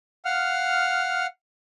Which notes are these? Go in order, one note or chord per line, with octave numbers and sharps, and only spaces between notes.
F5 F#5 F6